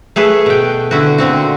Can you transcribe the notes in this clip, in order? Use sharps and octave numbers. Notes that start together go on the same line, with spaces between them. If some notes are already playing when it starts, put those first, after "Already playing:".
A3 G#4 A4 B4
B2 G5
D3 E4 F#4
A#2 D3 C4 F#4